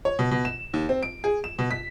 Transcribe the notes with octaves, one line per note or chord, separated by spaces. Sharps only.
C#5
B2
B2
E7
D#2
C4
D7
G#4
E7
B2
B6